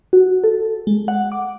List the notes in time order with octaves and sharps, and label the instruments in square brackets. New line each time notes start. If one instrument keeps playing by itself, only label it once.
[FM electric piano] F#4
A4
G#3
F#5
D6